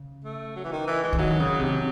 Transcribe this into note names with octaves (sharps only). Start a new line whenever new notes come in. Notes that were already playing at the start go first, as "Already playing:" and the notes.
Already playing: C#3
A3
F#3
E3
D#3
E3
G#3
E3
D#3 F#3
C#3
C3